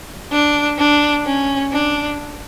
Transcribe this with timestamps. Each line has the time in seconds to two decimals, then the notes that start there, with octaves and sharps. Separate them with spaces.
0.32 D4
0.79 D4
1.25 C#4
1.72 D4